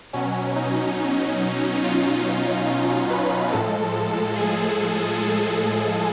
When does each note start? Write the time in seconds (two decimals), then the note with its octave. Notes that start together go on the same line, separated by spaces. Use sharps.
0.13 B2 F#3 C#4
0.56 D#4
1.84 F4
2.68 F4
3.10 B4
3.51 A2 F3 G#3 A4
4.36 G#4
5.21 A4